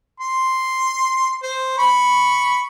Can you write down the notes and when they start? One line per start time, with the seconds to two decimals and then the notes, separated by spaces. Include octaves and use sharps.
0.20 C6
1.43 C5
1.78 B5 C#6